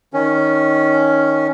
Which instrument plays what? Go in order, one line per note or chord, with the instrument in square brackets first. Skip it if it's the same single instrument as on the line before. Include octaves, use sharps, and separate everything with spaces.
[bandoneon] D#3 C#4